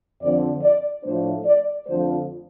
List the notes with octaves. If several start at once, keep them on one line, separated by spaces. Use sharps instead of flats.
F2 D3 F3 C4 D5
D5
A2 F3 A3 D4 C5
D5
F2 D3 F3 A3 C5